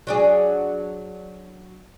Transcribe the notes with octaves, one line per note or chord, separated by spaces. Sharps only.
F#3 D4 G#4